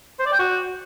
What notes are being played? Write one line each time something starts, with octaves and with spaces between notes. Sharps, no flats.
C5
D5
G5
F#4